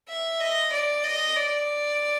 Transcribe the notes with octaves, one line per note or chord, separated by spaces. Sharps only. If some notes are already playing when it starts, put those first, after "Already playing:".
E5
D#5
D5
D#5
D5